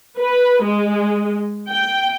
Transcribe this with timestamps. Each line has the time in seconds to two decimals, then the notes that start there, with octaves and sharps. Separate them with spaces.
0.18 B4
0.63 G#3
1.70 G5